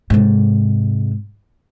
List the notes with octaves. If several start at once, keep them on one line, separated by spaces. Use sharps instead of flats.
G#2 C3